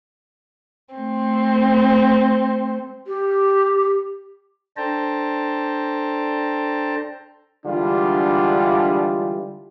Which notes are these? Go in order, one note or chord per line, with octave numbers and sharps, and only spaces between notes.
A3 C4
G4
D4 A4 C5 G5 A5 A#5
D3 E3 G3 G#3 D4 F4